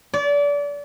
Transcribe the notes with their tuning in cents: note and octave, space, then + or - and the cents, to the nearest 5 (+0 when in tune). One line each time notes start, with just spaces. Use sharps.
D5 -30